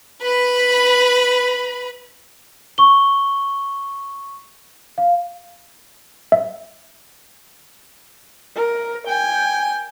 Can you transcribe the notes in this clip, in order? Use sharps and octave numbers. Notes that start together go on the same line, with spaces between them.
B4 B5
C#6 G7
F5
E5
A#4
G5 G#5